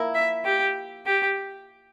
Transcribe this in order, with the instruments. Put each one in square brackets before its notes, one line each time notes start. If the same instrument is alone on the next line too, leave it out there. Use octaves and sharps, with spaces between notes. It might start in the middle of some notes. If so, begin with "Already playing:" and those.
Already playing: [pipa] F3 A#3 E4
[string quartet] E5
G4
G4